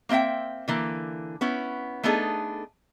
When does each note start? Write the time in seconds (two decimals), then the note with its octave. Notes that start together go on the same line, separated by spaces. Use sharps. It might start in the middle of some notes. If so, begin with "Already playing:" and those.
0.09 A#3 C4 D#5 E5 G5
0.68 D3 E3 A#3
1.41 B3 C#4 E4
2.03 A3 B3 D4 D#4 G#4 A4